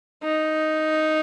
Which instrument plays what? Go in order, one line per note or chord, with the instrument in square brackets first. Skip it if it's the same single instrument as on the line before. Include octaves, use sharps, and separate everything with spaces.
[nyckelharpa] D#4